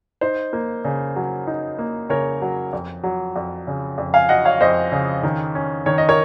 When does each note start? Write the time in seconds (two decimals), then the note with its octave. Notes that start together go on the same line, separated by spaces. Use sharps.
0.21 D#4 C5
0.53 A#3
0.85 C#3
1.16 F#3
1.47 D#4
1.78 A#3
2.09 C#3 A#4 C#5
2.42 F#3
2.73 F2
3.04 F#3
3.36 F2
3.67 C#3
3.98 F2
4.14 F5 G#5
4.29 F#3 D#5 F#5
4.45 C#5 F5
4.61 F2 C5 D#5
4.92 C#3
5.23 D#3
5.55 C#4
5.86 D#3 C#5
5.98 D#5
6.09 A#4 C#5